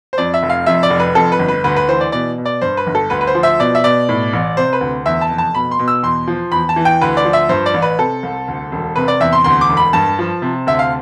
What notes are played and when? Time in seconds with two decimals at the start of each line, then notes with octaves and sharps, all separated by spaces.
0.13 C5
0.18 F2 D5
0.34 E5
0.43 F1
0.50 F5
0.66 F2 E5
0.83 D5
0.90 F1
1.00 B4
1.15 F2 A4
1.32 B4
1.39 G1
1.48 B4
1.64 D2 B4
1.76 B4
1.88 E3 C5
2.01 D5
2.12 B2 D5
2.38 B2
2.45 D5
2.61 G2 C5
2.77 B4
2.87 G1
2.95 A4
3.10 D2 B4
3.21 B4
3.27 C5
3.35 F3
3.43 E5
3.59 B2 D5
3.75 E5
3.84 B2 D5
4.09 A2
4.33 A1
4.57 C3 C5
4.73 B4
4.81 D2
5.06 E2 E5
5.21 A5
5.30 F1
5.38 A5
5.55 B2 B5
5.71 C6
5.79 B2
5.88 E6
6.03 E2 C6
6.28 F3
6.52 E2 B5
6.69 A5
6.76 E3
6.85 G5
7.01 D2 B4
7.17 D5
7.25 F3
7.33 E5
7.49 G2 C5
7.66 D5
7.74 A1
7.82 B4
7.99 C3 A4
8.23 C2
8.48 D2
8.72 E1
8.96 C3 B4
9.08 D5
9.20 E2 E5
9.33 C6
9.44 D2 C6
9.61 D6
9.69 E1
9.77 B5
9.93 G2 A5
10.19 F3
10.42 C3
10.67 D2 E5
10.79 F5